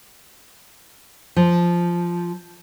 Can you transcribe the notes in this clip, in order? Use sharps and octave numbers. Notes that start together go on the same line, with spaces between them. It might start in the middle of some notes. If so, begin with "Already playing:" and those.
F3